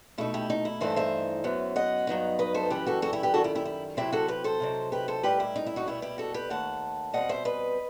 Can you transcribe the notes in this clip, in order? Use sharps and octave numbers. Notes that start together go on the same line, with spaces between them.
B2 A3 D#4 E4
E4 G4
D#4
E4
G2 E3 A3 D#4 A4 C5
C5 E5
F#2 F#3 B3
D#5 F#5
G2 F#3 B3 D#4
B4 D#5
A4 C5
F#2 E3 G3 G4 B4
F#4 A4
F#4 A4
E4 G4
G4 B4
F#2 D#3 G3 F#4 A4
E4 G4
E4 G4
E4
C3 F#3 C4 E4 G4
F#4 A4
G4 B4
A4 C5
C3 F#3 C4 D#4
G4 B4
A4 C5
A2 G3 D#4 G4 B4
E4
D#4
E4
D#4 F#4
B2 G3 B3 E4
E4 G4
F#4 A4
G4 B4
D#2 D#3 A3 F#5 A5
B2 G3 C4 D#5 F#5
C5 E5
B4 D#5